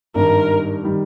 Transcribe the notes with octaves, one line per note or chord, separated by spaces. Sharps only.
G#1 G2 D#3 G3 A#4
D#3 G3